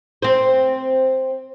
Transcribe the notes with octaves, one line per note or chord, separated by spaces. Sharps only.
C4 C5